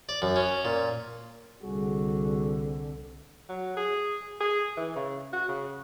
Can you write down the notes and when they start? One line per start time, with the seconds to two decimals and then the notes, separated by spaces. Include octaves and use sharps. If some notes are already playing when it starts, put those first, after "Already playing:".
0.09 D5
0.22 F#2
0.36 C#4
0.65 A#2
1.63 C2 D3 G3 F#4 G#4
3.49 F#3
3.77 G#4
4.40 G#4
4.77 E3
4.96 C#3
5.33 F#4
5.48 C#3